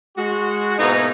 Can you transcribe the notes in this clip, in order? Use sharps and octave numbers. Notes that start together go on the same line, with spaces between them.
G#3 F#4
G#2 B2 A#3 D#4 E4 D#5